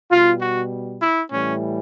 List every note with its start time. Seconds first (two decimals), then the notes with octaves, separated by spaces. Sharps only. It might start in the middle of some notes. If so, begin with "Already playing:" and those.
0.11 B2 G3 F4
0.40 F#4
1.02 E4
1.32 A2 E3 G3 C#4